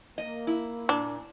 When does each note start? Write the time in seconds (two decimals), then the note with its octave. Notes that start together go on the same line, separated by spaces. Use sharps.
0.18 A#3 D#5
0.47 E4
0.89 A#2 D4